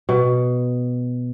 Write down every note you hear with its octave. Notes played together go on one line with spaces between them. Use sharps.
B2